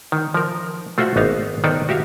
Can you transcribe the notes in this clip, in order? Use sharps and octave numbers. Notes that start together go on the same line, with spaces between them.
D#3
F3 A#4
A3 F4 F#4 C5 E5 F#5
G#1 B3 D#4 F5
D#3 B3 A4 C5 D5 D#5
F#4 G4 E5 F5